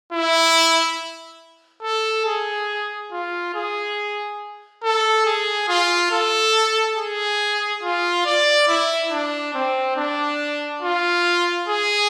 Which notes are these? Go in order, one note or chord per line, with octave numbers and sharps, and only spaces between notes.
E4
A4
G#4
F4
G#4
A4
G#4
F4
A4
G#4
F4
D5
E4
D4
C4
D4
F4
G#4